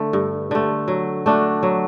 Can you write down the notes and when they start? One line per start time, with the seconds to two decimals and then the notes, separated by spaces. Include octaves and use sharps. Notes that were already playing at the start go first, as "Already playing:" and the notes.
Already playing: D3 A3
0.13 G2
0.51 D3 A3
0.88 F#3
1.26 A3 D4 F#4
1.63 F#3